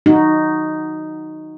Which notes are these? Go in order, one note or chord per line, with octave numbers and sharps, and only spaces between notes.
D#4 F#4